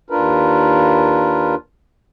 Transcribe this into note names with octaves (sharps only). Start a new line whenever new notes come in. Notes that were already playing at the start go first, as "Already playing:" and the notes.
D#2 D4 F4 A#4 B4